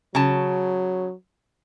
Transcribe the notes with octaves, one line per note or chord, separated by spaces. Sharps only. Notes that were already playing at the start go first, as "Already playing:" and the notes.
C#3 F#3 A5